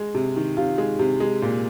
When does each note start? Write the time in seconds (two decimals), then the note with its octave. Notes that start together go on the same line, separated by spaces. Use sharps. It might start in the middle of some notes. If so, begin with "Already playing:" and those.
Already playing: G#3
0.15 C3
0.36 D#3
0.57 C3 F4
0.78 G#3
0.99 C3
1.20 G#3
1.42 A#2